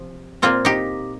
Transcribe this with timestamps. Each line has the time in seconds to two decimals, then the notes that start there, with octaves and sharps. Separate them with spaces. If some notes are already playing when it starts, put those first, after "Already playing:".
Already playing: C3 F3
0.42 A#2 A#3 C4 F4
0.65 D#4 G4